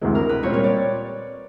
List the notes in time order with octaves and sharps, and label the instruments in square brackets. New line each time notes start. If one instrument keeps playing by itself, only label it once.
[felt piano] D2 C3 E3 G#3
[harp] A#4
B4
[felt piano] A#2 G3 C4 [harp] C#5
[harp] C#5
D5